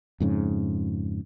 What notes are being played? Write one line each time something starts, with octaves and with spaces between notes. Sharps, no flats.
F2 G#2 C#3